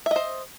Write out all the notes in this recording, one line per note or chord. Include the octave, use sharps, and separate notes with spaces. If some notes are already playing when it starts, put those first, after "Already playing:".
C5 D#5 E5